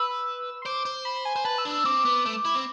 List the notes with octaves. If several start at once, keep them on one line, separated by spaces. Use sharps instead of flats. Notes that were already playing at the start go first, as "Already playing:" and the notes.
Already playing: B4 E6
C6
C5 D6
C5
B5
G#5
C5
B4 A5
E6
D4
E6
C4 D6
B3
A3
E4
C4